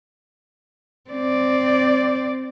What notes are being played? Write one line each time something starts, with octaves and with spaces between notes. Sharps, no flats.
C4 D5